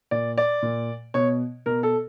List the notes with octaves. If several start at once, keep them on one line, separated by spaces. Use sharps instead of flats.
A#2 D5
D5
A#2
B2 C#5
B2 A#4
A4